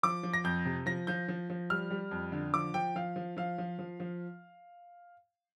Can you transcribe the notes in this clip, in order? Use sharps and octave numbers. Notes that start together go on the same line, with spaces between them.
F3 D6
F3
A#6
F2 G6
C3
F3 A#6
F3 G6
F3
F3
G3 F6
G3
F2
D3
F3 D6
F3 G5
F3 F5
F3
F3 F5
F3
F3
F3